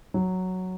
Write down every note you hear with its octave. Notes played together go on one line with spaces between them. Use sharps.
F#3